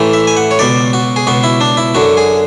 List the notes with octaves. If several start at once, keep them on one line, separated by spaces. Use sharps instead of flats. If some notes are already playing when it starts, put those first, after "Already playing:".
Already playing: A1 A2 E3
E5
G#5
F#5
C#5
C#2 B2 D5
F#4
G#4
C#2 B2 F#4
E4
D4
E4
F#2 D3 F#4
G#4